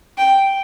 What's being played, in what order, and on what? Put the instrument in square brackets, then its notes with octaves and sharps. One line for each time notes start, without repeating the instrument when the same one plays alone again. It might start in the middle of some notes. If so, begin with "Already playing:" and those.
[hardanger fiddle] G5